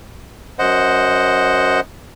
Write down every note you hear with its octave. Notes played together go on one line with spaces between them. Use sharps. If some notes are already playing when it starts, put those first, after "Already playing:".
F#2 C5 D#5 F#5